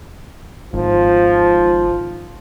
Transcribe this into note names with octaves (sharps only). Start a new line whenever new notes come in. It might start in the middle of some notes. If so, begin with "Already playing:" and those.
G#1 F3